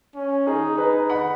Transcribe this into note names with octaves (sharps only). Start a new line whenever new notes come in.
C#4
D#4 G#4
D#4 B4
F#5 B5